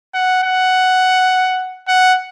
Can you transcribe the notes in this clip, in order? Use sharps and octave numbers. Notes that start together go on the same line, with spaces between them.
F#5
F#5
F#5